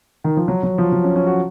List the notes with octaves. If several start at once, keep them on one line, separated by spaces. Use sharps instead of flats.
D#3
F3
F#3
F#3
F3
F#3
C#4
C#4
F#4